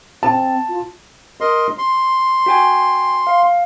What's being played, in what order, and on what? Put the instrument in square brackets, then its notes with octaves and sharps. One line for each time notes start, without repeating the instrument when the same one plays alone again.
[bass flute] C4 [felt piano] A5
[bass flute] F4
[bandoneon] A#4 D#5 C6
C6
[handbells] F#4 G5 G#5
F5